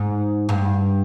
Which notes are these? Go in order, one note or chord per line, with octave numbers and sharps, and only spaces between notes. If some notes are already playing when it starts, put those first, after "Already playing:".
Already playing: G#2
G2